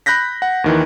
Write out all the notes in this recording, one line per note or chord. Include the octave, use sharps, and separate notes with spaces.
B5 F#6 G6 A#6 B6
F#5
D#2 D#3 E3